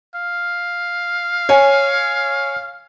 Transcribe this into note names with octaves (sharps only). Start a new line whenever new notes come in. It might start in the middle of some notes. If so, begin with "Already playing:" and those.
F5
C#5 G#5